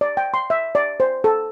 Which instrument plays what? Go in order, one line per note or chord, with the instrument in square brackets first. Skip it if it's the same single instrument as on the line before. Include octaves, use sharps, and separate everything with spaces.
[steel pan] D5
G5
C6
E5
D5
C5
A4